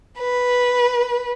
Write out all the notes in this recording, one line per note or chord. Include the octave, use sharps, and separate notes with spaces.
B4